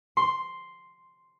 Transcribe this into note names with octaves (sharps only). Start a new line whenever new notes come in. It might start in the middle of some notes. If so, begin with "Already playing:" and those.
C6